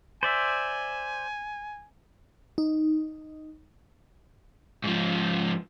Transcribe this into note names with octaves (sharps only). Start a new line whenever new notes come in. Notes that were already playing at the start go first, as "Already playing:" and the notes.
C5 D5 E5 G#5
D#4
G#2 F3